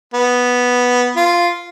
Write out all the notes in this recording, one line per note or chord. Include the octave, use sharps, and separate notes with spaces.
B3
F4